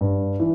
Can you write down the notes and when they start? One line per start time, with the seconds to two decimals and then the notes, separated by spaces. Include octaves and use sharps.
0.01 G2
0.40 E3